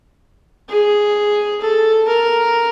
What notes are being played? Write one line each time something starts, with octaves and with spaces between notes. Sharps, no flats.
G#4
A4
A#4